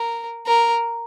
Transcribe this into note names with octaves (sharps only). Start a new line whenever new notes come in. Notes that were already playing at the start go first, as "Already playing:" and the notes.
Already playing: A#4
A#4